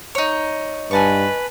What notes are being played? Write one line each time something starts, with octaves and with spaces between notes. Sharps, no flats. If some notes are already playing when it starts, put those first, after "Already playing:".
D#4 C#5
G2 B4 G#5 A5 C#6